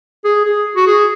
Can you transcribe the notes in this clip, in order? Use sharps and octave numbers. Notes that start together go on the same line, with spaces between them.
G#4
G#4
F#4
G#4